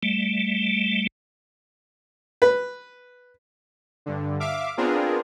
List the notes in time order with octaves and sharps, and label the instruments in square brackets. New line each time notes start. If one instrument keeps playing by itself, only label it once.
[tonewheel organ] G3 A3
[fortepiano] B4
[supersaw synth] G2 D3
E5 F5 D6
B3 C4 D4 F4 G#4 A#4